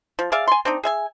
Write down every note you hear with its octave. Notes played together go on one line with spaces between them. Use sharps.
F3
G#4 D5 E5 F5
G#5 C6
C4 D4 D#4
G#4 E5 G#5